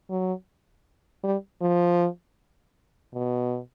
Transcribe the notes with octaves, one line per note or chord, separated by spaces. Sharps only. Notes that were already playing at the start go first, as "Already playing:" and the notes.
F#3
G3
F3
B2